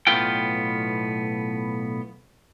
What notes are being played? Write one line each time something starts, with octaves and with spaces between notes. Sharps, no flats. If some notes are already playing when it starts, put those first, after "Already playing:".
B1 A2 B3 F4 G5